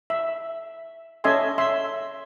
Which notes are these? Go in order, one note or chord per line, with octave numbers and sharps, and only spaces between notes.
E5
C#4 A4 D#5 E5 G#5 C6
E5 C6